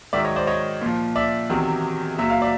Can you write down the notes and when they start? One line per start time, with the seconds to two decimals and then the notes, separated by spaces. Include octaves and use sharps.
0.13 G#2 D#3 F#3 D5 E5
0.25 C#5 D#5
0.36 C5 D5
0.47 C#5 D#5
0.82 A#2 F3
1.16 D5 E5
1.50 E2 C3 D#3 F#3
2.18 A#2 F#3 E5
2.30 F5
2.42 D5 E5